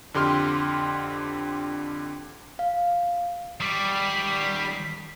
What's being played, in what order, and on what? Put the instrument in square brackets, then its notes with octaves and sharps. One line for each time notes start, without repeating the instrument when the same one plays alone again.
[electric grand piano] F2 D3 G4 C6 F6
[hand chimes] F5
[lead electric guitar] D#3 D5 [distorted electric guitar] G3 [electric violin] B6 C7